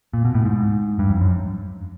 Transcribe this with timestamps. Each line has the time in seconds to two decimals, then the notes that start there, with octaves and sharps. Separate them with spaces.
0.13 A#2
0.25 B2
0.35 A2
0.45 G#2
0.99 G2
1.10 F2
1.21 F#2